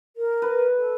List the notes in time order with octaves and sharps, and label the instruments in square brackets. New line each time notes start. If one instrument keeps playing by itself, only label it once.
[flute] A#4
[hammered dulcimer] B4
[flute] A4